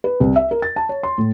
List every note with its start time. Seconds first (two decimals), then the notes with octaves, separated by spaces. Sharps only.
0.04 B4
0.20 C2
0.36 E5
0.51 A#4
0.62 A6
0.76 A5
0.89 C#5
1.03 C6
1.18 A2